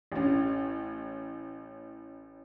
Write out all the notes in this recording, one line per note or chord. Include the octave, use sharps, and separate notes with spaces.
A1 C#4